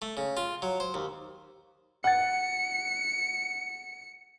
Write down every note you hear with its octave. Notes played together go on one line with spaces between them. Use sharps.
A3
C#3
F4
F#3
C5
D#2
F#5 A6 C#7